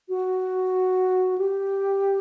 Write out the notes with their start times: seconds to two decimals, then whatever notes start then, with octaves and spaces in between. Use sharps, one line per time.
0.09 F#4
1.38 G4